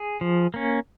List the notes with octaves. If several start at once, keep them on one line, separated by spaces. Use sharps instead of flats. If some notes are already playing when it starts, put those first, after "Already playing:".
Already playing: G#4
F3
A#3 C#4